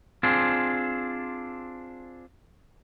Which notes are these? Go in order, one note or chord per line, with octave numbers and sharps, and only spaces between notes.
C4 D4 F4 G#4